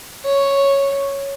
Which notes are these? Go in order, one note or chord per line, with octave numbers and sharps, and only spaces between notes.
C#5